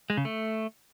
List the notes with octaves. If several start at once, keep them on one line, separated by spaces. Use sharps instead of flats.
G#3
C#3
A3